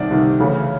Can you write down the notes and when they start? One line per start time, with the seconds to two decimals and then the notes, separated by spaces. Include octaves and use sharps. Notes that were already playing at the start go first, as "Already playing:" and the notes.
Already playing: C2 C3 D#3 D5
0.11 C2 C3 D#3
0.40 D2 C#3 E3